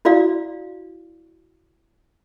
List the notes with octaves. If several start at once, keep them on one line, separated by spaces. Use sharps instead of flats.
E4 F#4 D5 F5